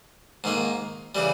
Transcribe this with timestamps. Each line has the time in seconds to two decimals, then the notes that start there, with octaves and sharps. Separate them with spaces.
0.44 G#2 D#3 A#3
1.15 C#3 E3 G3